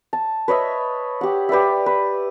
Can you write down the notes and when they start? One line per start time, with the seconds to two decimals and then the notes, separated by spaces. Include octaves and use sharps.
0.13 A5
0.48 B4 C#5 D#5 E5
1.21 G4 F#5
1.49 G4 B4 D5 E5
1.86 B4